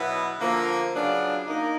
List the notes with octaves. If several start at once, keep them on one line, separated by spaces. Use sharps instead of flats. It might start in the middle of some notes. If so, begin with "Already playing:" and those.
Already playing: B2 F#3 B3 E4
D3 F3 A#3
C#3 F#3 B3 D4 F4
A#3 D#4